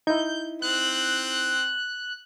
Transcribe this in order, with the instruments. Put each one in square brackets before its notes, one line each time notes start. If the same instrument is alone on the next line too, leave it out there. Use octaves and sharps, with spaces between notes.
[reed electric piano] D#4 E4 [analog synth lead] G6
[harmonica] C4 [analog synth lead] F#6